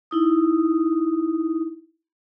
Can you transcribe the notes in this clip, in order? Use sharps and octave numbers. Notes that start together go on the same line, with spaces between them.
D#4 E4 D#6